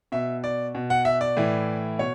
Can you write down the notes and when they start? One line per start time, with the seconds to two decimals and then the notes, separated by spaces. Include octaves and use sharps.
0.12 B2 E5
0.44 D5
0.75 B2
0.90 F#5
1.05 E5
1.21 D5
1.37 A2 E3
1.99 B2 C#5